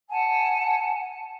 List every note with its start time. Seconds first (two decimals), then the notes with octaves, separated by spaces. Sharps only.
0.09 F#5 G#5 A5